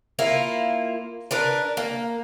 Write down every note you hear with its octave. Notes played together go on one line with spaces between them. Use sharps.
A#3 E4 F4
D4 A#4 B4
A#3